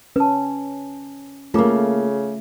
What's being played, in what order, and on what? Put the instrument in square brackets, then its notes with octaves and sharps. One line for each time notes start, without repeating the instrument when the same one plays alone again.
[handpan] C#4 [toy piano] B4 A5
[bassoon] C#3 [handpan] A3 [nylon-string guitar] A#3 A4 [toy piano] F4 D6